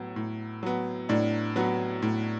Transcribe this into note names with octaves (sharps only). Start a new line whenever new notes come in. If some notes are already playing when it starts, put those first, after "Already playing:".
Already playing: A2 F#3 B3
A2
F#3 B3
A2 D4
F#3 B3
A2